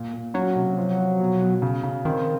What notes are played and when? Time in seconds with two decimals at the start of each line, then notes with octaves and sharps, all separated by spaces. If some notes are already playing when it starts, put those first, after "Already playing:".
Already playing: A#2
0.13 A#2
0.34 F#3 C#4
0.56 C3
0.77 F3
0.98 F3
1.20 B2
1.42 B2
1.62 C#3
1.83 C#3
2.05 D#3 C4